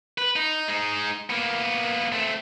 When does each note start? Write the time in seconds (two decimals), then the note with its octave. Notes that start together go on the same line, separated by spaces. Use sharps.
0.18 B4
0.36 D#4
0.68 G#3 D#4
1.30 A#3 B3
2.12 A3 C4